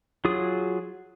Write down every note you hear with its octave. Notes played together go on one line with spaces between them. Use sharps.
F#3 F4 G#4 D#6